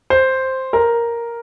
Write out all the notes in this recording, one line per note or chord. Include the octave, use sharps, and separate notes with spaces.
C5
A#4